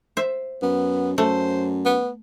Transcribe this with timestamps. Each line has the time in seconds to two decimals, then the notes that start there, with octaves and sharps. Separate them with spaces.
0.17 C5 E5
0.62 F#2 B3
1.18 F#2 A3 C5
1.85 B3